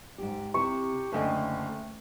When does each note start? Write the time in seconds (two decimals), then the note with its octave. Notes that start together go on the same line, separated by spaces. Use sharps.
0.18 G#2 G4
0.54 C3 E4 G4 C#6
1.12 F#1 D3 A3 D#5 G5 G#5